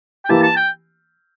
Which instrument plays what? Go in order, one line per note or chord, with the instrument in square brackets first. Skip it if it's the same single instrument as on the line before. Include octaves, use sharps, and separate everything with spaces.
[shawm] G5
[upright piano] E3 A#3 E4 G4 [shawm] A5
[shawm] A5
G5